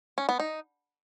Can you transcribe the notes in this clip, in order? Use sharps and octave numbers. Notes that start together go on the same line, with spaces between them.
C#4
B3
D#4